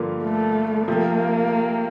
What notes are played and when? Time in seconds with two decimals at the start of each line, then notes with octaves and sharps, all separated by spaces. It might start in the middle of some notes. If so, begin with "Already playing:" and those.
Already playing: G2 D3 F3 A#3 F4
0.23 A3
0.87 C3 F3 A3 A#3